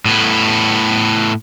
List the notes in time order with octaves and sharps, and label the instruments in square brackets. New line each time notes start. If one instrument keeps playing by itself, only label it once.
[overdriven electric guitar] A2 B3